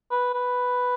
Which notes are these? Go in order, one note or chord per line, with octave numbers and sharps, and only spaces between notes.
B4
B4